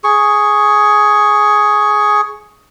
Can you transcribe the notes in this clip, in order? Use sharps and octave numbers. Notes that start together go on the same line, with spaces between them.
G#4 C#6